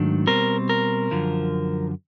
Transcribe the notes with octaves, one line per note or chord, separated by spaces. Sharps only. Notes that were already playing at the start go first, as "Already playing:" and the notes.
Already playing: G#2 D#3 F#3 A3 D4
B2 G3 C4 A#4
A#4
F#2 D3 F3